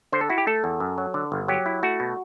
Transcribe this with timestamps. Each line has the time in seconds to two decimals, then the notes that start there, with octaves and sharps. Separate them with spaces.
0.12 D3 C5
0.21 A4
0.30 E4 F#4
0.38 G4
0.47 A3 A4
0.64 E2
0.80 F#2
0.98 F#3
1.14 D3
1.32 G1
1.48 F#3 G4
1.66 E4
1.83 A3 F#4
2.00 B2